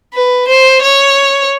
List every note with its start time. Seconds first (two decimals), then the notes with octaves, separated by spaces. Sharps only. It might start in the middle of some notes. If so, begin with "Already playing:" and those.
0.14 B4
0.48 C5
0.82 C#5